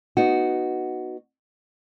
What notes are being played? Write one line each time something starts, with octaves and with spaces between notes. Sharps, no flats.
B3 D#4 F#4